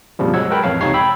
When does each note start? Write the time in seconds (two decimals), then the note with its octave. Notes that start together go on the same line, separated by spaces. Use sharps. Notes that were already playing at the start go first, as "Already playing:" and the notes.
0.19 F2 A#2 C#3 F3 G3
0.34 F#3 G#3 F#5 E6 G#6
0.50 A#4 B4 G5 A5 B5
0.63 A1 F2 C#5 F5 A5
0.81 C#2 C3 D#4 C#5 C7
0.94 G5 B5 E6